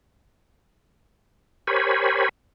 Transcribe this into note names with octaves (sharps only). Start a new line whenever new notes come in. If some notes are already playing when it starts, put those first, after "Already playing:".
G4 A#4 C5 C#5 G#5 B5